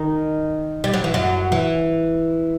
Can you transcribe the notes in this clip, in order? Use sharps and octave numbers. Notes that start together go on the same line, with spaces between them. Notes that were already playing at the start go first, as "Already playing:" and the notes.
Already playing: D#3 D#4
G3
F#3
E3
F#2 F#3
E3